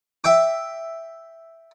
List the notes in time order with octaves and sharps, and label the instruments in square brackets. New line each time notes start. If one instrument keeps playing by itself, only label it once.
[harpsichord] E5 G5 D6